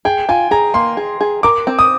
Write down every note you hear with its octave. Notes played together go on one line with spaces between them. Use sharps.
G#4 G5
F4 G#5
G#4 A#5
A#3 C6
G#4
G#4
A#4 D6
C4
D#6